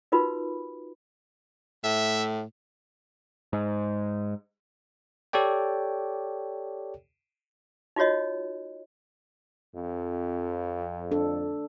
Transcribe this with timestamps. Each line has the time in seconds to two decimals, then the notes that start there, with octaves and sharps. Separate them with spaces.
0.12 D#4 F4 F#4 A#4 B4 B5
1.84 A2 E5
3.53 G#2
5.33 G4 A4 C#5 D5 G5
7.96 D#4 F4 F#4 C#5 D#5
9.75 F2
11.11 D4 A4